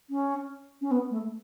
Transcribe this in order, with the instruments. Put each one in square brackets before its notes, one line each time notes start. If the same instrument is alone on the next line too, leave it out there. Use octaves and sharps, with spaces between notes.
[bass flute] C#4
C#4
B3
A3